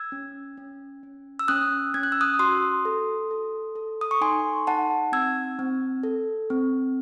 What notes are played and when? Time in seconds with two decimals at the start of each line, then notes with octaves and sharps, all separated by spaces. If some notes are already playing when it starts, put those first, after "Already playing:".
Already playing: E6 G#6
0.12 C#4
0.57 C#4
1.03 C#4
1.39 E6
1.48 C#4 D#6 F#6
1.94 C#4 G#6
2.03 F#6
2.12 E6
2.21 D#6 F#6
2.39 F#4 C6 D#6
2.85 A4
3.31 A4
3.75 A4
4.01 D#6
4.11 C#6
4.21 D#4 G#5 C6
4.67 D#4 F#5 A5
5.12 C4 E6 G#6
5.59 C4
6.03 A4
6.50 C4